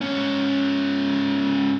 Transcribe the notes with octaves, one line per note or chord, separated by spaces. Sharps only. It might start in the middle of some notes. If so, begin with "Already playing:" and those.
G#2 C#4